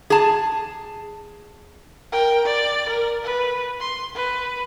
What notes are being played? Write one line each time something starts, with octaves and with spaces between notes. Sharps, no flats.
G#4 A5
A#4 G5
D5
A#4
B4
C6
B4